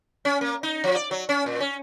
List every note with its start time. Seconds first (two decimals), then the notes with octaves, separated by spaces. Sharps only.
0.25 C#4
0.41 A#3
0.63 D#4
0.84 F3
0.96 D5
1.11 F#3
1.29 C#4
1.46 A#2
1.60 C#4